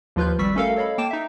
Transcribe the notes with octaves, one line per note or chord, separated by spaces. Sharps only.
D#2 F3 F4 B4 F6 G6
G#1 G3 D5 C#6 E6 B6
A3 C#4 F#4 A4 A#4 F5
A4 C#5 D#5 F5 B5
A#3 G5 A5 D6 E7
D#4 E5